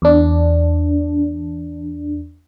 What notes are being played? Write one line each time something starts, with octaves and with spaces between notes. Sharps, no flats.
E2 D4